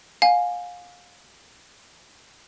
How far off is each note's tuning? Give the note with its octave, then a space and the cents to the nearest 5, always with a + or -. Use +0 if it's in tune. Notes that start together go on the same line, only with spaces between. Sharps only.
F5 +30 G#5 +0